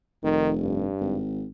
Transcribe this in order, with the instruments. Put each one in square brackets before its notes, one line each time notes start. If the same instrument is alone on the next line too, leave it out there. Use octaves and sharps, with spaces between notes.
[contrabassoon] F1 [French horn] D#3
[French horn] G2
[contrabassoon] G#1